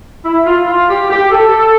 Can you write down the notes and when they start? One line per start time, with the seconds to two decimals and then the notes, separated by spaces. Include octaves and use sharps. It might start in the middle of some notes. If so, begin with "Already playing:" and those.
0.25 E4
0.46 F4
0.68 F4
0.89 G4
1.10 G4
1.31 A4